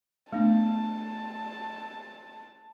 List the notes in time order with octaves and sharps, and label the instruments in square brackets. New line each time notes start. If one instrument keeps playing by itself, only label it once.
[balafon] A3 B3 D4 [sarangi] A5